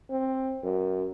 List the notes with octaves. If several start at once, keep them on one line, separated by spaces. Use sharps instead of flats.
C4
F#2